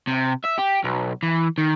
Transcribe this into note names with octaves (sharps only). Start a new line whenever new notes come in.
C3
E5
G4
B1
E3
D#3